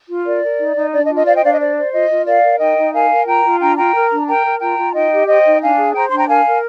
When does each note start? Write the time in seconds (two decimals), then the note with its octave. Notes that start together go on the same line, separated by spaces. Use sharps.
0.09 F4
0.26 A#4 D5
0.43 A#4
0.59 D#4
0.76 D#4
0.93 D4 D5
1.04 D#5
1.10 F4
1.15 D#5
1.26 C5 D5 F5
1.35 D#5 G5
1.43 D4 D5 F5
1.51 D#5
1.60 C5 D5
1.76 C5
1.94 F4 D#5
2.09 F4
2.26 A#4 D5 F5
2.44 A#4
2.60 D#4 D#5 G5
2.77 D#4
2.94 A#4 F5 G#5
3.11 A#4
3.26 F4 G5 A#5
3.44 F4
3.61 D4 G5 A#5
3.77 F4 G5 A#5
3.94 A#4
4.11 D4
4.27 A#4 G5 A#5
4.44 A#4
4.60 F4 G5 A#5
4.78 F4
4.94 D#4 D#5 G5
5.11 G4
5.28 C5 D#5 G5
5.45 D#4
5.62 D4 F5 G#5
5.77 G#4
5.94 C5 G5 A#5
6.09 D4 C6
6.16 G5 A#5
6.28 A#4 F5 G#5
6.46 A#4